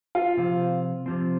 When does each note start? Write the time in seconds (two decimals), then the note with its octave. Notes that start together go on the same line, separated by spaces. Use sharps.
0.15 F4
0.37 C3 F3 C4
1.06 C3 F3 C4